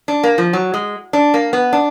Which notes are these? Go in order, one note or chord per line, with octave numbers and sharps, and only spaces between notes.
D4
A#3
F3
F#3
G#3
D4
A#3
B3
D4